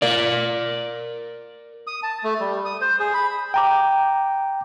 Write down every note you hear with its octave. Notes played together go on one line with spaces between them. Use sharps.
A#4 D5
D#6
A5
A3
G3
D#6
C5
G#4
B5
G5 A#5 D6